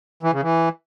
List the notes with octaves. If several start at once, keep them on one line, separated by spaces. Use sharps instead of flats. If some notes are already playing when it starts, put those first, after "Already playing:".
E3
C#3
E3